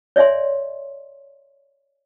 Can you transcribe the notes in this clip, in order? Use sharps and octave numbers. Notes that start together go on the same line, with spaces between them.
C#5 D5 E5 G#5 C6